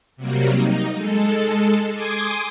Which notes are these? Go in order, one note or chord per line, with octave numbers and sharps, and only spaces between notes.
C3 F#3 G3 A#3
D#4
G#3 A4
G#5 C6 D6 D#6 G#6